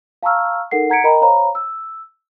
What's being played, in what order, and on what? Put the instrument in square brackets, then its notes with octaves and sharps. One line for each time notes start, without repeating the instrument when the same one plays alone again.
[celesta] F5 A5 A#5 C#6 E6 F6
D#4 A4 A#4 F#5 C7
F#5 A#5 G#6 B6 C#7 D7
A#4 D#5 G5 A#5 B5
C5 C#5 F5 A#5 B5
E6